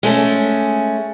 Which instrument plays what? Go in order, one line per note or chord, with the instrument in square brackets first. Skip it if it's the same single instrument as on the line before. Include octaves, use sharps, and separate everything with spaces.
[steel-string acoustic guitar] G#3 A3 C#4